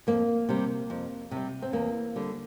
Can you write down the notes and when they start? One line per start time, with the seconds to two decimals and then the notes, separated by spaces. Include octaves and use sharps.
0.07 F2 A#3
0.49 C3 G3
0.90 F2
1.31 C3
1.37 G3
1.62 C4
1.73 E2 A#3
2.16 D3 G3